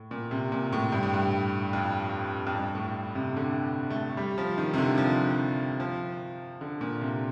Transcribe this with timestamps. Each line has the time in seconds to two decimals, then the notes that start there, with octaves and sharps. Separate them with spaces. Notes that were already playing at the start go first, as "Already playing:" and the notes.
Already playing: A2
0.11 A#2
0.31 C3
0.52 A#2
0.73 A2
0.92 G2
1.02 A2
1.14 G2
1.73 F2
2.47 F2
2.54 G2
2.75 A2
3.15 C3
3.36 D3
3.90 A3
4.17 G3
4.38 F3
4.58 D#3
4.74 C3
4.78 D3
4.98 F3
5.80 F3
6.61 D3
6.81 A#2
7.02 C3